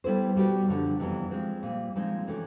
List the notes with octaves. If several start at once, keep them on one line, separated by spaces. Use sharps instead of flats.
G3 B3 E4 A4 C5
B2 G3 B3 D#4 G4
F#2 D3 F3
F2 C3 E3 G3 B3
F3 G#3 C4
A#2 G3 C4
A#2 F3 G#3 C4 D#4
C3 E3 A3 C#4